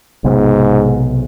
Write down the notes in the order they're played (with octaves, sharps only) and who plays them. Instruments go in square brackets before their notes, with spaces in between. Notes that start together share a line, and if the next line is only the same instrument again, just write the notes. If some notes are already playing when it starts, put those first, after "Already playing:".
[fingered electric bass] B1 C3 B3 [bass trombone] G#2